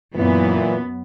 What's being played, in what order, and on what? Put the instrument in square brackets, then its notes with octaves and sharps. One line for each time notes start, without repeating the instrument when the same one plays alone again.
[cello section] F#2 B3 [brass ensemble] A#2 E3